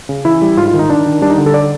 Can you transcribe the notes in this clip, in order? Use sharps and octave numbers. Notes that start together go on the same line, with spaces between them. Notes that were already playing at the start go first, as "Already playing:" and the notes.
C#3
E3 E4
G3
G#2 F4
F4
D#3
D#4
D#3 D4
D#3
G3 D4
D#4
D3
A4
D5